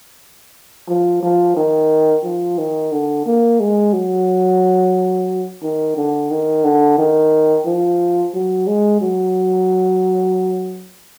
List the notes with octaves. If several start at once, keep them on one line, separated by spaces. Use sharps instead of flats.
F3
F3
D#3
F3
D#3
D3
A#3
G#3
F#3
D#3
D3
D#3
D3
D#3
F3
F#3
G#3
F#3